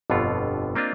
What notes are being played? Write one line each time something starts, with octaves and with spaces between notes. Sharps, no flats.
G1 F2 B2 D3 B3 F4
A#3 C4 D4 F4 D#5